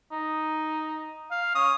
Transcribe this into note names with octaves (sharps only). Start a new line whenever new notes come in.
D#4
F5
C#4 D#6